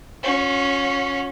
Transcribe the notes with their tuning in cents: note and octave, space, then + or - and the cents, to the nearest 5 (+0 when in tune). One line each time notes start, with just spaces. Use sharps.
C#4 +0 F#4 -45